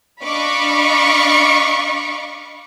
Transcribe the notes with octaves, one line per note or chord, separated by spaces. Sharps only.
D4 D#5 F5 B5 C#6 D6